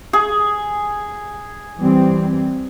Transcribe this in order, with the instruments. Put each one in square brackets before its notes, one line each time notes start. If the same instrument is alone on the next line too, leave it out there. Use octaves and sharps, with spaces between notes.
[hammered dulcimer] G#4
[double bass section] E3 G3 C4